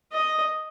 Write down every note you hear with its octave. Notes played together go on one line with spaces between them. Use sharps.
D#5